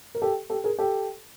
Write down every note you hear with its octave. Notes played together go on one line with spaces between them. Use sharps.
A#4
G4 A4
G4 A4
G#4 A#4
G4 A4